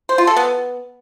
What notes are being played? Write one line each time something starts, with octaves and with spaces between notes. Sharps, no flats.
C5
F4
A4
B3